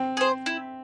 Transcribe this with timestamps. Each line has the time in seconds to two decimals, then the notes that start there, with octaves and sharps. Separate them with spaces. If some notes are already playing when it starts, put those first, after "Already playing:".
Already playing: C4
0.17 G#4 C5
0.46 E4